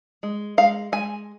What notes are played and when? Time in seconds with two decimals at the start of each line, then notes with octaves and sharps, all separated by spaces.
0.23 G#3
0.58 G#3 F5
0.92 G#3 G#5